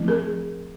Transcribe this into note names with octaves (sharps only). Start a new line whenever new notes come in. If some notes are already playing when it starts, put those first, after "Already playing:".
Already playing: F3 A3 C4 E4
G#4 A#4